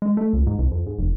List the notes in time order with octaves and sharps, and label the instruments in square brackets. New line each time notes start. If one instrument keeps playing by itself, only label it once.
[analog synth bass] G#3
A3
C#2
G#2
C2
F2
G#2
F1